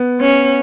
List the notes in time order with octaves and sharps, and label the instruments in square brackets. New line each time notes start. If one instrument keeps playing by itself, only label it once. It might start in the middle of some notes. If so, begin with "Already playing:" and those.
Already playing: [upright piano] B3
[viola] C#4